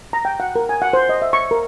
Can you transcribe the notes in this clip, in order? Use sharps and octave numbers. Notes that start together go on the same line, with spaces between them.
A#5
G5
F#5
A#4
G#5
F#5
C5
D#5
E5
C#6
A#4